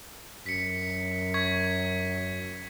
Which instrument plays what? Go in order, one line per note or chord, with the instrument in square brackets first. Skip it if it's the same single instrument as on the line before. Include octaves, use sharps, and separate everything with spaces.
[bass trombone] F#2 [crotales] B6 C#7
[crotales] C#6 G#6 B6